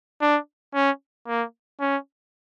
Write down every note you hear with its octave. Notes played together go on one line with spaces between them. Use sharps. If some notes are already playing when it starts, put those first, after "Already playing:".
D4
C#4
A#3
C#4